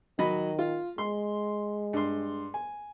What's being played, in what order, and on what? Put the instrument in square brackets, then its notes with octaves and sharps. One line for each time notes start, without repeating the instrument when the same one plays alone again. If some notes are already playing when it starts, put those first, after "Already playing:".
[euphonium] D#3 [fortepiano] F#3 D#5 B5
[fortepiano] F4
[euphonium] G#3 [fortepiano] C6
[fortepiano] G2 C6
G#5